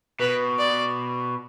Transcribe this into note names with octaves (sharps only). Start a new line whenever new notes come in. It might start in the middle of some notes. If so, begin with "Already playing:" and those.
B2 B4
D5